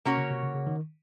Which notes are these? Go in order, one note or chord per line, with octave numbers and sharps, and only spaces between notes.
C3 A#3 C#4 F#4 C#5
C#3
C3
C#3
C#3
D#3